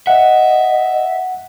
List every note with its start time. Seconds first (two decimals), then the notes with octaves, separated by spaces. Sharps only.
0.07 D#5 E5 F#5